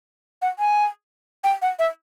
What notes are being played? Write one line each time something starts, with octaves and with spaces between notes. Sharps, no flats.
F#5
G#5
G5
F#5
E5